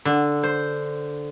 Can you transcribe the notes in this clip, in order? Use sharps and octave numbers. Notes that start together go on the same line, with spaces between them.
D3
C5